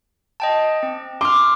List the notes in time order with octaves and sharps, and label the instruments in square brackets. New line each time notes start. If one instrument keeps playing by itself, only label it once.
[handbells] D#5 G5 A5
C4
[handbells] C6 F6 [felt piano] D6